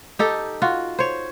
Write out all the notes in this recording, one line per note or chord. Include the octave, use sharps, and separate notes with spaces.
D#4 G4 A4
F4 F#4
C5 C#5